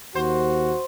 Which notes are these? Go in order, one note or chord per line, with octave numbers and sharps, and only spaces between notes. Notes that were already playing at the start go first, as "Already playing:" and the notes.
D#2 F#4 C5